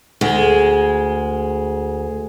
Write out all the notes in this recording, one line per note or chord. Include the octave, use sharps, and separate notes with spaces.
D2 G#3